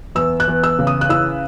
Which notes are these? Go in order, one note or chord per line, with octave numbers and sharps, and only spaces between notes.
E2 E6
F#6
E2
E6
C#3
D#6
F#6
E4 E6